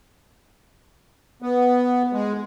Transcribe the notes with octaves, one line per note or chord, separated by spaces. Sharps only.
B3
G#3